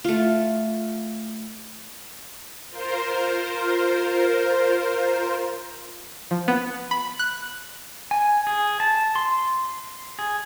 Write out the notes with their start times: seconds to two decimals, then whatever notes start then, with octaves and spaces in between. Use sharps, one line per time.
0.04 A3 F4
2.69 F4 A#4 C5
6.31 F3
6.48 B3
6.91 B5
7.19 F#6
8.11 G#5
8.47 G#4
8.80 A5
9.16 C6
10.19 G#4